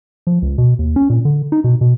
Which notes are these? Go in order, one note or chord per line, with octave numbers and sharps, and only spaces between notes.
F3
C#2
B2
D#2
C#4
A#2
D3
D#4
B2
B2